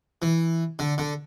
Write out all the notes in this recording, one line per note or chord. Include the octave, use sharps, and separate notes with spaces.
E3
D3
D3